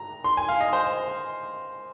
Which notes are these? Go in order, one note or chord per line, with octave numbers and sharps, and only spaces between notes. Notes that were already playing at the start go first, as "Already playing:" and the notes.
Already playing: A#5
C6
G#5
F5
D#5
C5